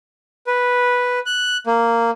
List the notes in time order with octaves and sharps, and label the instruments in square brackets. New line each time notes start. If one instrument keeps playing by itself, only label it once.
[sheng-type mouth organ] B4
F#6
A#3